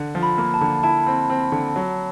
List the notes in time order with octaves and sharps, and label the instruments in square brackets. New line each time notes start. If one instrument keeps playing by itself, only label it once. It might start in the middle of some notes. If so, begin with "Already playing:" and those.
Already playing: [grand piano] D3
F3
[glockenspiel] B5
[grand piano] A#3
[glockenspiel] A5
[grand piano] D3
[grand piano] E4 [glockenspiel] A5
[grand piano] C4
C4
D3
F#3